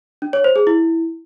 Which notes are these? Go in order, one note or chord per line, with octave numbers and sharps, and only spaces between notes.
D4
C#5
C5
G#4
E4